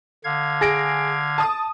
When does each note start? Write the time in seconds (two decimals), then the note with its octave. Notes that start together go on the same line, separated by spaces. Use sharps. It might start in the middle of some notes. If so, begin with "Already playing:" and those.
0.24 D3 F5 G#6
0.61 G#4 A#6 D7
1.38 A5 D#6